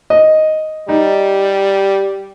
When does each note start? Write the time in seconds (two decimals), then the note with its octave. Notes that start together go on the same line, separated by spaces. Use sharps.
0.10 D#5
0.89 G3 D#4